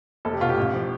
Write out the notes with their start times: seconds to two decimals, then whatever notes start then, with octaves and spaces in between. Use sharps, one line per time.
0.25 F1 A4
0.33 G4
0.41 B2 F4
0.49 G4
0.57 A1
0.74 F3